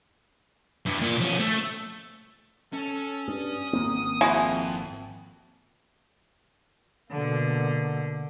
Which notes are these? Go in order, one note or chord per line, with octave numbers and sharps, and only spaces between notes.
G2 E3
A#2
F3 C#4
A3 A4
C#4 A4
G2 D#6
G#1 A#3 C4
F2 G#3 E4 F#4
B2 D3 A#3